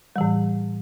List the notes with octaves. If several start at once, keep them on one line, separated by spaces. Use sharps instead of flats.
A2 E3 G3